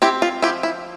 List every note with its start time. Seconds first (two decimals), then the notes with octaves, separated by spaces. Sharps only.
0.02 C4 E4 G4
0.22 F4
0.42 F3 E4 G4
0.63 E4